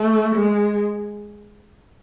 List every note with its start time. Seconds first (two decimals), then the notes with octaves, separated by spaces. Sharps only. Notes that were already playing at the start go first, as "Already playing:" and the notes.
Already playing: A3
0.36 G#3